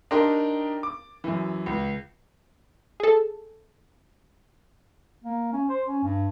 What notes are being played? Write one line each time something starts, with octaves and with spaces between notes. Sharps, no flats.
D4 D#4 G4 A#4 C6
D6
F#2 E3
C#2
G#4 A4
A#3
C#4
C5
C#4
G2